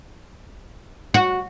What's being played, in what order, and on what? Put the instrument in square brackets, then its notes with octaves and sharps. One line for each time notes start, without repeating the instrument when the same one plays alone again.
[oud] F#4